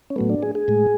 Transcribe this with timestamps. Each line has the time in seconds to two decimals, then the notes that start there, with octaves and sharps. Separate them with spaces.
0.10 C#4
0.16 A2 F#3 A3 B3
0.29 D4
0.43 G#4
0.55 G#4
0.68 A2 G#3